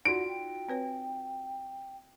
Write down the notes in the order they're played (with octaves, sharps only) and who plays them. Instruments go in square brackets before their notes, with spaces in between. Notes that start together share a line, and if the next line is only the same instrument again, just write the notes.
[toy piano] D#4 F4 F#4 [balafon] D5 [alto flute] F#5 [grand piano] D7
[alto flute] G5
[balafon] C4 B4 C#5 [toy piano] G#5